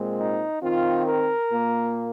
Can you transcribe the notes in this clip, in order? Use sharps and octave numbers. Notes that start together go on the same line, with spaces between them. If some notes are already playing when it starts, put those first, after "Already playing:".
Already playing: A#2 G#3 C4
D#4
D#3 C4 F4
A#4
A#2 A#3